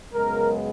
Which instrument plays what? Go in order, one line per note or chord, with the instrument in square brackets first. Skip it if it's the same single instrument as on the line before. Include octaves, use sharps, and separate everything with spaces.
[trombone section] F#2 C#3 G#3 B3 A#4